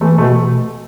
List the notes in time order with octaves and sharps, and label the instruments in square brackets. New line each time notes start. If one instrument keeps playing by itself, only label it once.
[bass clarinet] E3 [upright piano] A3
[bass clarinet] B2 [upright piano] A3